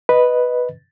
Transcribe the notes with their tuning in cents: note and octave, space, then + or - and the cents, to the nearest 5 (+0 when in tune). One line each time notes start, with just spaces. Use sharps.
B4 +0 D#5 +0